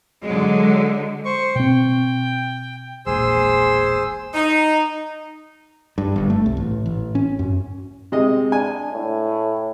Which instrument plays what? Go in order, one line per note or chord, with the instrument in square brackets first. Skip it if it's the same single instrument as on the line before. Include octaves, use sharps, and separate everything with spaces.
[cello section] D3 F#3 G#3
[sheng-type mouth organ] C5 C#6
[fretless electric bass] B2 C4 [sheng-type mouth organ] G5
[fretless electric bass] E1 A#1 [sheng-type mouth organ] G#4 C5 E6
[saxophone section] D#4
[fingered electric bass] G2
G1
A3
C2
A1
A1
C#4
F#2
[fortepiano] C3 G#3 D#5
[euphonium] D4 [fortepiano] G#5
[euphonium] A2